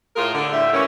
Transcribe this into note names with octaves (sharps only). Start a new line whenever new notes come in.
A2 A#3 F4 G#4 A#4
D3
A2 G3 E5
E3 A#3 C#4